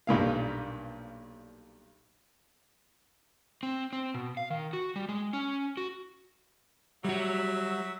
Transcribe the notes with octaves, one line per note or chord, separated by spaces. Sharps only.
B1 G2 A#2 F5
C4
C4
B2
F5
D#3
F#4
G3
G#3
C#4
F#4
F#3 G3 F#4 E5